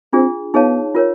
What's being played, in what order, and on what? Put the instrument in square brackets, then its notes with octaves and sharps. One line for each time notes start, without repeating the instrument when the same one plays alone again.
[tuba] C4 [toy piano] D4 F4 G#4
[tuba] B3 [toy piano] D#4 G#4 C#5 F5 A5
[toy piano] F4 A#4 C#5